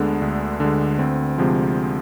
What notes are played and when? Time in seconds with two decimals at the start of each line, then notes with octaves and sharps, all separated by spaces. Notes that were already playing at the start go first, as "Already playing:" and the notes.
Already playing: D2 D3 G#3 B3 D4
0.22 D2
0.60 D3 G#3
0.99 D2 C4
1.38 C3 F3 G#3